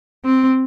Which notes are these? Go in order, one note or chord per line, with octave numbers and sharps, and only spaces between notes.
C4